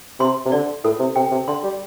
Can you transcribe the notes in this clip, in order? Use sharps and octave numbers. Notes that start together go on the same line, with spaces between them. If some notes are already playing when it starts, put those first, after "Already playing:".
C3 C6
C3
D3 D5
A2 A4
C3
C3 G5
C3
D3 C6
G3